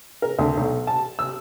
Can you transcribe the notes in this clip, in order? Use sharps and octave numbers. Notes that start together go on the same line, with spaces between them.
A#4
D2
B1
A5
E6